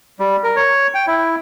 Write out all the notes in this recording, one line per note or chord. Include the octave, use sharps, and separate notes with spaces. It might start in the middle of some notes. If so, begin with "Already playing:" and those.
G3
A#4
C#5
G5
E4